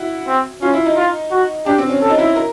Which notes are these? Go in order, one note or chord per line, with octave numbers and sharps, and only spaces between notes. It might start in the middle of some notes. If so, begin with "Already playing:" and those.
Already playing: E4 F#4
C4
C#4 F4
E4
D#4
F4
F#4
D4 G4
C4
C#4
A4
D#4
E4
A#4